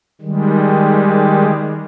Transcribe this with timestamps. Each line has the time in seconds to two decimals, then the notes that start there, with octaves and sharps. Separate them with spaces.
0.21 D#3 G3 G#3